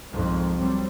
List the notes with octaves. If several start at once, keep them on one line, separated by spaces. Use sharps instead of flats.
C2 F2 G#2 D#3
F#3 G3 C4